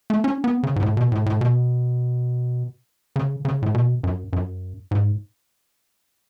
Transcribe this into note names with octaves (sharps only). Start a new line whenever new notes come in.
A3
C#4
B3
C#3
G#2
A2
B2
A2
A2
B2
C#3
C#3
A2
B2
F#2
F#2
G#2